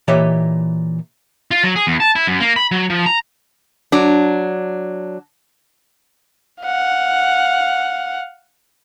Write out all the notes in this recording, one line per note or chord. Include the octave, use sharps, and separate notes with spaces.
A#2 E3 G4 C#5 D#5 E5
F4
F#3
G#4
E2
A5
E4
F#2
A#3
B5
F#3
F3
A#5
F#3 D4
F5 F#5